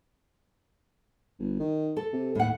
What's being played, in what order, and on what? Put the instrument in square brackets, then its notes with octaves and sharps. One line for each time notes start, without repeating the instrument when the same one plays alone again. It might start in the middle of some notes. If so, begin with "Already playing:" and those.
[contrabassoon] G1
D#3
[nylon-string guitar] A4
[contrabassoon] C3
[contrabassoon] D#2 [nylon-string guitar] A2 F#5